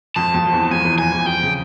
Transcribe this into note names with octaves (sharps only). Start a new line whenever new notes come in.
F2 F3 A5
F2 F3
F3
E2 E3
F2 F3 G#5
E2 E3
F2 F3 G#5
E2 E3
F2 F3 G5
C#3